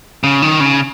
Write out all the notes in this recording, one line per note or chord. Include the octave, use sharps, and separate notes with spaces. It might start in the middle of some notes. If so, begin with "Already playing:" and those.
C#3
D#3
C#3